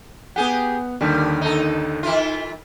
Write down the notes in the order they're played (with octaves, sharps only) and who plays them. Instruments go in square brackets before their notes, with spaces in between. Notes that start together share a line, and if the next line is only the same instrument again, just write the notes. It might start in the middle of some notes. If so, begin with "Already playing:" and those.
[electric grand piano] B3 F#5 [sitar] G4 G#4
[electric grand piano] D#2 D3 D#3 [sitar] G3
[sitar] D#4 A4
D#3 E4 F4